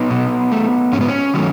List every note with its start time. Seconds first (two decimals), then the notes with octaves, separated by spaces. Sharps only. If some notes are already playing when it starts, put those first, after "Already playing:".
Already playing: B3 D#4
0.10 B2
0.52 A3
0.93 G#2 C#4
1.01 B3
1.09 C#4
1.34 D#3 F#3 A3